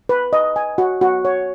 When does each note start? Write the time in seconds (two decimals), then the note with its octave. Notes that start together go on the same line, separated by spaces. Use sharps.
0.09 B4
0.33 D#5
0.56 G#5
0.78 F#4
1.01 F#4
1.25 C#5